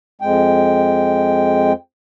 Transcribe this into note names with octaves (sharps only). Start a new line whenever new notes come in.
F2 G#3 G5